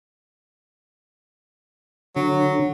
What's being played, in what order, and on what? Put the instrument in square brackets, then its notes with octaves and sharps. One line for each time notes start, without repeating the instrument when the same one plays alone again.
[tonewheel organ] D3 [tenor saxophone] F#3